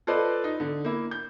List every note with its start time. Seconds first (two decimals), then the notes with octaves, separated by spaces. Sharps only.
0.07 F4 A4 B4 C5 D5 D#5
0.44 D#4
0.60 D3
0.84 A#3 E4
1.11 G6